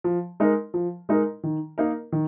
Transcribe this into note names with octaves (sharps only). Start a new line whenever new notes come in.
F3
G#3 D#4 A#4
F3
G#3 D#4 A#4
D#3
A#3 D#4 A#4
D#3